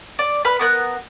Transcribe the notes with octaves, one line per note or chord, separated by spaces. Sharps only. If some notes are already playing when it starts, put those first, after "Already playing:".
D5
B4 B5 F6
B3 A#4 F#6